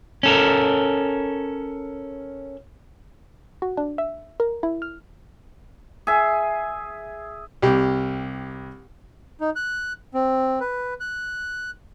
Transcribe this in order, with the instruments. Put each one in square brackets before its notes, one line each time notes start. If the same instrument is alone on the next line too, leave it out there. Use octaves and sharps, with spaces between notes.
[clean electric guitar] C#4 A4 A#4
[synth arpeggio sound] F#4
D4
E5
A#4
E4
F6
[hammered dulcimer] G#4 E5
[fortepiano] C2 G4
[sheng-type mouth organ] D#4
F#6
C4
B4
F#6